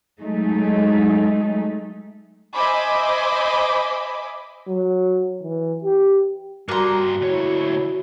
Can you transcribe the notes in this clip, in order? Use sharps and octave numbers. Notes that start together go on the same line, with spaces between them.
F#3 G#3 A3 D#4
C5 D#5 E5 G#5 B5 D6
F#3
E3
G4
G2 G3 A#3 F#4 A#5 C6
D2 E4 C#5